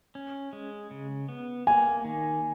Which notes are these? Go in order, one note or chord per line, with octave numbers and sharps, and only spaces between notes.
C#4
G#3
C#3
B3
A#3 G#5
D#3